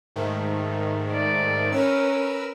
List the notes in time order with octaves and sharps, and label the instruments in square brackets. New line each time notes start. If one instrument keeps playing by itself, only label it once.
[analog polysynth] G#2 D#3 A3
[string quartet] D5
[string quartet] C#4 [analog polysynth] A#4 B4 E6